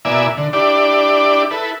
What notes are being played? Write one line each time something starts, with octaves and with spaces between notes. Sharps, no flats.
B2 A#3 E4 D5 E5 G#5
D3
D4 E4 G4 D5
E4 A4 B4